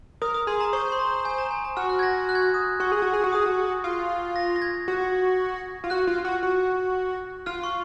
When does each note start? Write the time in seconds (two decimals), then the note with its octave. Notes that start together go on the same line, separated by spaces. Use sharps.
0.22 A#4 D#6
0.34 D#6
0.47 G#4 C6
0.61 A#5
0.73 C5 C#6
0.92 C6
0.99 A#5
1.25 G#5
1.38 A#5
1.51 G#5
1.65 A#5
1.77 F#4 F6
1.89 F#6
1.99 G#6
2.03 A#6
2.29 F#6
2.35 G#6
2.42 F#6
2.54 D#6
2.80 F#4 C#6
2.92 G#4
3.02 F#4
3.13 G#4
3.24 F#4
3.32 G#4 D#6
3.46 F#4
3.84 F4
4.36 A#6
4.56 A#6
4.62 G#6
4.88 F#4
5.84 F4
5.90 F#4 F#6
6.07 F4
6.25 F#4
6.43 F#4
7.46 F4 F6
7.64 C#6